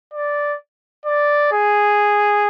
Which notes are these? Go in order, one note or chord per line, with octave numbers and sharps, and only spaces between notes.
D5
D5
G#4